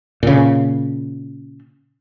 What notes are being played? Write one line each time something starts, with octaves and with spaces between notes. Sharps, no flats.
A#2 C#3